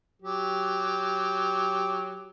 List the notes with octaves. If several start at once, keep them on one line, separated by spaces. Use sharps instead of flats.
F#3 G4